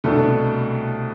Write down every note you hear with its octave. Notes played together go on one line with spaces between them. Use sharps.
C2 B2 A3 D4 A4